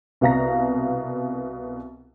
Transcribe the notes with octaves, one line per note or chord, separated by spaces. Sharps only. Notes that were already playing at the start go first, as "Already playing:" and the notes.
C2 B2 F5 A#5 A#6